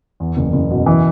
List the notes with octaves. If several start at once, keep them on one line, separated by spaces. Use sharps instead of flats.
E2
F#1
F#1
B2
E3